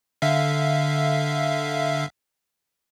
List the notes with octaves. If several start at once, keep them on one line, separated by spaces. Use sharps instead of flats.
D3 E5 F5